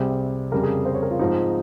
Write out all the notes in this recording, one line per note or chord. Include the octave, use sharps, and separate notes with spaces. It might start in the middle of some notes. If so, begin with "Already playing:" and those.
Already playing: C2 C3 G3 C4 G#4
F2 C#3 G3 A#4
G#4
C5
C#5
A#4
F4
G#2 F3 C4 D#4